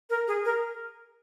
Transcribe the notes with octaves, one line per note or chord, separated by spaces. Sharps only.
A#4
G#4
A#4